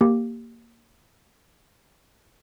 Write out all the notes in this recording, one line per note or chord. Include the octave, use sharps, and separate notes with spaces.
A#3 G4